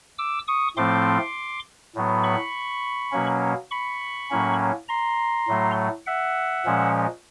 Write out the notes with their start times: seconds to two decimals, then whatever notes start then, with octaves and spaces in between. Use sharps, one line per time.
0.18 D6 E6
0.48 C#6 D#6
0.76 A2 F3 A3 C4 C6 D6
1.95 A2 F#3 B3
2.24 B5 C#6
3.12 B2 F#3 A#3 C#4
3.71 B5 C#6
4.30 A2 F#3 A#3 C#4
4.88 A#5 C6
5.48 A2 F#3 A3
6.07 E5 F#5
6.66 A#2 F3 G#3 C#4